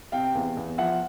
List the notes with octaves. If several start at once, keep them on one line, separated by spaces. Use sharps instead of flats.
C3 F5 G5
E2
E2
F3 E5 F#5